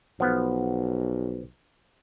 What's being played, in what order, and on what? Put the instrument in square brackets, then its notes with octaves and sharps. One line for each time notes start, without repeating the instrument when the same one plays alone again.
[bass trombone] B1 [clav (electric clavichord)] F3 B3